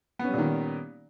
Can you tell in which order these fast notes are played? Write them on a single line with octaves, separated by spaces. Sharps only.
B3 C#4 G3 A#2 D#3